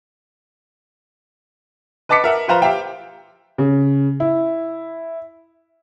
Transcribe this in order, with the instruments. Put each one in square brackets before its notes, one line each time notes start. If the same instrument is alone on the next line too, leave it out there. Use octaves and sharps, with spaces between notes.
[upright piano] B4 D#5 A5 D6 B6 C#7
A#4 E5 F#5
F3 B4 C5 F5 A#5 E7
G4 E5 F5 G5
[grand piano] C#3
E4